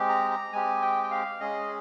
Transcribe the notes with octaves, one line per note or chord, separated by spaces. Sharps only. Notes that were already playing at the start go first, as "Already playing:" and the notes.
Already playing: G#3 C4 G4
A#5
A#5
G#3 C4 G4 G#5
G5
G5
F5
G#3 C#4 G#4 D#5